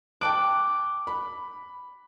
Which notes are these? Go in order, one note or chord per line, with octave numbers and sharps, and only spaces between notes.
G5 A5 D6 F#6
B5